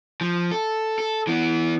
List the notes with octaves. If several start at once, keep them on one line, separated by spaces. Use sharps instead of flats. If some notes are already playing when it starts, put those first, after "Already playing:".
F3
A4
A4
E3 B3